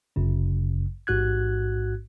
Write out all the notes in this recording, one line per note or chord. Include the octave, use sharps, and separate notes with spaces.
G1 F#2 C#3
A1 G#2 F#4 F#6 G#6